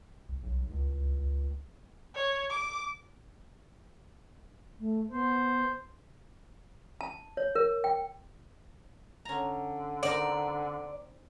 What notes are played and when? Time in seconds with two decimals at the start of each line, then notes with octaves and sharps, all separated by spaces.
0.29 C2
0.43 B1
0.71 C#2
2.15 C#5
2.50 D6
4.80 A3
5.11 B3 C5
7.01 A5
7.37 C#5
7.55 A#4
7.84 G5
9.25 D3 C#4 A#5
10.03 C4 D#4 A#4 D5